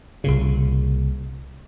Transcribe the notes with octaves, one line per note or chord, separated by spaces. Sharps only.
C2 A#2 C#3